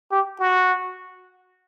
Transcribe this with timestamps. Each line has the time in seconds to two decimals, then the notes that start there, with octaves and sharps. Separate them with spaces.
0.12 G4
0.40 F#4